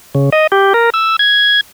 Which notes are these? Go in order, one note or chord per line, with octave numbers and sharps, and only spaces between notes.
C#3
D#5
G4
A#4
E6
G#6